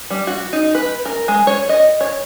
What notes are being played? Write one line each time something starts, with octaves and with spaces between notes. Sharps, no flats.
G3
F#4
D#4
B4
A#4
G#3
C#5
D#5
C#5